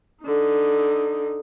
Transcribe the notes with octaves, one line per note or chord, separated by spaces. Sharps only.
D3 D#4